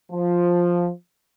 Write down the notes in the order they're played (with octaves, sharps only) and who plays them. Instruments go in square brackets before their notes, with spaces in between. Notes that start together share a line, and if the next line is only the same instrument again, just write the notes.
[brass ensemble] F3